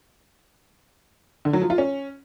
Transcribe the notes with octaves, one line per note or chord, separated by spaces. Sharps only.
D3
F#3
F3
F4
C#4